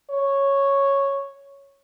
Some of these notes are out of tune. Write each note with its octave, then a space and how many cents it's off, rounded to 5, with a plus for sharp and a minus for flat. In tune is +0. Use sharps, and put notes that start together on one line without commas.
C#5 -5